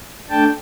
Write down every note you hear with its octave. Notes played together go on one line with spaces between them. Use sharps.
A3 D4 G5 A5